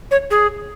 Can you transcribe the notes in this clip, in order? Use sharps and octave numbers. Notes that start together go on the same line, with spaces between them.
C#5
G#4